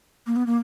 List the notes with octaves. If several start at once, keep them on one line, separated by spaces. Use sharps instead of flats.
A#3
B3
A#3